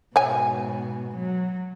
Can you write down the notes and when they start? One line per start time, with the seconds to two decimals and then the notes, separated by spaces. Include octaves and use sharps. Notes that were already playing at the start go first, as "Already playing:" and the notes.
0.16 G#2 B2 C#5 G#5
1.13 F#3